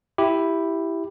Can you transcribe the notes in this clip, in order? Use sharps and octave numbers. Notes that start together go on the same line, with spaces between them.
E4 G4